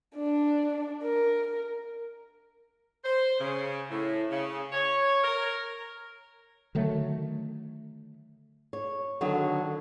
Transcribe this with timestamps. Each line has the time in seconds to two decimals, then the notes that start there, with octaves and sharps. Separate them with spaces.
0.15 D4
1.03 A#4
3.05 C5
3.39 C#3
3.89 A2
4.30 C#3
4.72 C#5
5.24 A#4
6.75 D3 D#3 F#3 A3
8.73 C#5
9.21 D3 D#3 F#3 B3